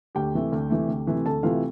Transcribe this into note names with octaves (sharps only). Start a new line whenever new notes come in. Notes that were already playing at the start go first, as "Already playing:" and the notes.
D2 G4 G5
C3 E3 A3
D2
C3 E3 A3
D2
C3 E3 A3
D2 A4 A5
C3 E3 A3 F4 F5